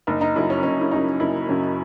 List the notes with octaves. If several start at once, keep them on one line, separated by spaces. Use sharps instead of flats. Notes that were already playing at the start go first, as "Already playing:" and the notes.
F#1 D#4
D#4
F#2 C#3 F#3 E4
C#4
F#1 C#4
E4
F#2 C#3 F#3 D#4
F#1 E4
F#2 C#3 F#3